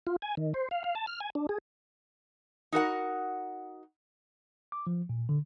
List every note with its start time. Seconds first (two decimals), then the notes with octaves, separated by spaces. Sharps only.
0.07 F4
0.22 G#5
0.37 D#3
0.54 C5
0.71 F5
0.84 F5
0.95 A5
1.07 F6
1.20 G#5
1.35 D4
1.49 G#4
2.72 D#4 F#4 A#4 F#5
4.72 D6
4.87 F3
5.09 A#2
5.29 D3